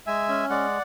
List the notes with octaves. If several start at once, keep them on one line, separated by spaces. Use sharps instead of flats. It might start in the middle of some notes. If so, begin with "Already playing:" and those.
G#3 E5 G#5
C#4
G#3 D5 F#5